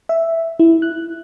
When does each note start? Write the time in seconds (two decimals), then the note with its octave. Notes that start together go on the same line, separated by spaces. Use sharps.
0.09 E5
0.59 E4
0.82 F#6